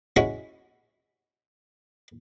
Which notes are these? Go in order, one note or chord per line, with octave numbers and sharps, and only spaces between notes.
G#3 C#4 E4 F#4